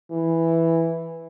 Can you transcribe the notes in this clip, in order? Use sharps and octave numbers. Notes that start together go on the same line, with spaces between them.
E3